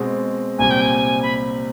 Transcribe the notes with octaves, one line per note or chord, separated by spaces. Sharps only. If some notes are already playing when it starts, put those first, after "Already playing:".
Already playing: B2 G#3 C4
C2 A#2 G3 C4 G#5
G5
G#5
B5